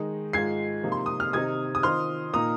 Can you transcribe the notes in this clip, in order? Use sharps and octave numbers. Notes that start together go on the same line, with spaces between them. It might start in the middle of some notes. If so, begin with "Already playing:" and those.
Already playing: D#3 G#3 D#4
G#2 D#3 G#3 F4 G#6 C7
C3 F3 A#3 D#4
C6
D#6
F6
C3 D#3 C4 D#4 D#6 G#6
D#6
D#3 C4 F4 C6 F6
A#2 A#3 D#4 A#5 D#6